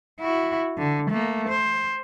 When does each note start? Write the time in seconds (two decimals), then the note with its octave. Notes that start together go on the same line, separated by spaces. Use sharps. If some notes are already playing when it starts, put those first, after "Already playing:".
0.21 E4 F#4
0.78 D3
1.10 A3 A#3
1.49 C5